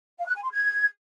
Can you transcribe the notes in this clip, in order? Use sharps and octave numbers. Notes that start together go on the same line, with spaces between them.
F5
F#6
G#5
C6
G#6